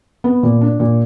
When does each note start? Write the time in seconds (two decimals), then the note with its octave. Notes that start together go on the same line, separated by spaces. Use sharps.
0.24 B3
0.43 A#2
0.61 D4
0.80 A#2